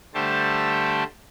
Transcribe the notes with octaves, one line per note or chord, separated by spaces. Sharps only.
D3 G3 A3 G4 C5 A5